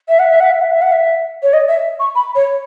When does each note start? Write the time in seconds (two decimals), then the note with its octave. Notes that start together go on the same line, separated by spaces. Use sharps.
0.09 E5
0.19 F#5
0.30 E5
0.40 F#5
0.51 E5
0.61 F#5
0.71 E5
0.82 F#5
0.92 E5
1.43 C#5
1.53 D#5
1.68 E5
2.00 C#6
2.15 B5
2.35 C#5